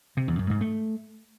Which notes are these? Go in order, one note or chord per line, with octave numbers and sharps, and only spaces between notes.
C3
E2
F#2
G#2
A3